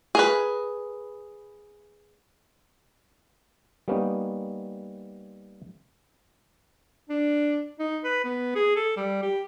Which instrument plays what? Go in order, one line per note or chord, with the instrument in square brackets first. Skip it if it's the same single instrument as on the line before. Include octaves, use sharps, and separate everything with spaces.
[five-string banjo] G#4 A#4 B4
[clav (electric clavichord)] G3 A#3 B3 C#4 D#4
[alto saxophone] D4
D#4
B4
B3
G#4
A4
G3
G4